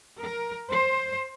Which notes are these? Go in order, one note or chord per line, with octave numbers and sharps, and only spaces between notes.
A#4
C5